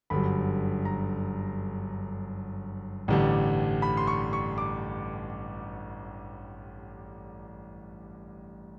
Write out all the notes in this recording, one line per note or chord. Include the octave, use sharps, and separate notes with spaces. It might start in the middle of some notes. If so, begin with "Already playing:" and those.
G1 F#2 D3 G3 B5
A#5
A1 G2 D3 G3
B5
C6
C#6
C#6
D6